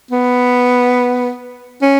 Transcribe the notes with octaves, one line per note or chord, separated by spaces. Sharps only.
B3
C#4